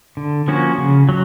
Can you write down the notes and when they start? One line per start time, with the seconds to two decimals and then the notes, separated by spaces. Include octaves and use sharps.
0.17 D3
0.48 F3 A#3 C#4 F#4
0.78 C#3
1.09 F#3